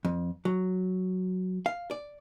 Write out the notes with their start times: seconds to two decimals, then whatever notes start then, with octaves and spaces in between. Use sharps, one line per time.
0.05 F2
0.45 F#3
1.66 F5
1.91 D5